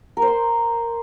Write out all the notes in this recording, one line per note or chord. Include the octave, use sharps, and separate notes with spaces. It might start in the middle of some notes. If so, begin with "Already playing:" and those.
A#4
C5
C6